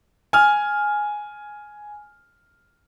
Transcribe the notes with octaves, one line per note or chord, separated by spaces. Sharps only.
G#5 F6